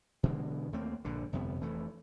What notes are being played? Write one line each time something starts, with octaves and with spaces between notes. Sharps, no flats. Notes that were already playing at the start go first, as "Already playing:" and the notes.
B2 D3 E3 G#3
D#2 A3 A#3 C4
A#1 G2 D3
G1 F2 C3 B3
F1 E3 A3